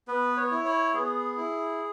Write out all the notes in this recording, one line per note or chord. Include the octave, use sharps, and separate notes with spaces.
B3 B4
C#5
E4
C#5
B3 G#4
E4